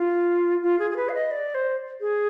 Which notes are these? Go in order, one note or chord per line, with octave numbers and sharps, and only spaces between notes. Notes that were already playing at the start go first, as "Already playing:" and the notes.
Already playing: F4
F4
G#4
G#4
B4
F5
D#5
D5
C5
G#4